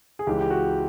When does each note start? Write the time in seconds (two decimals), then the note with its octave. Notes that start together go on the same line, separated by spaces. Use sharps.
0.19 G#4
0.27 C#2 C#3 E3 G4
0.41 G4
0.50 F#4